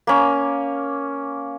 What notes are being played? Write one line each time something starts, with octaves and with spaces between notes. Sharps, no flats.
A#3 C#4